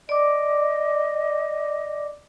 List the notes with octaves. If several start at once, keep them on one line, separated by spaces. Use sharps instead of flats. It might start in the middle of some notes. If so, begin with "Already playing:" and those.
D5 D#5 D6